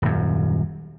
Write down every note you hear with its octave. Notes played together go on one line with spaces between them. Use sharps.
D#1 F#2